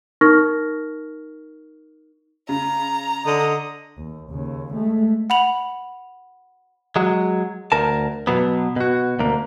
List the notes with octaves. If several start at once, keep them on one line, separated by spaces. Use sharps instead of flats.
D#4 A#4 C#6 F6 A#6
C#3 A#5
D3 D#5
D#2
D#2 C#3
G#3 A3
F#5 B5 F7 F#7
F#3 G#3
D2 A#4 A5
B2 F#3 B3
B2 F#4
D2 A#3